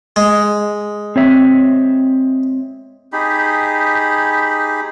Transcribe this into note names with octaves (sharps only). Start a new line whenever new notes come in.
G#3
C4 C#5 E5
D#4 G4 G#4 B5